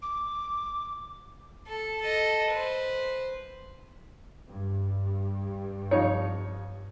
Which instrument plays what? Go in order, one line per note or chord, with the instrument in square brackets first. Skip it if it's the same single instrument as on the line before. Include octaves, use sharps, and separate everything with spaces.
[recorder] D6
[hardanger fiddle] A4
A4 D#5
B4 C5
[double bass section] G2
[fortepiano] F2 D#4 C#5